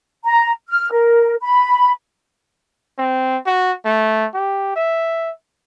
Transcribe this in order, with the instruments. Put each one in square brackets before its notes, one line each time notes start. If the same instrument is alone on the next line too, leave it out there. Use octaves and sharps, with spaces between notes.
[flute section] A#5
F6
A#4
B5
[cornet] C4
F#4
A3
G4
E5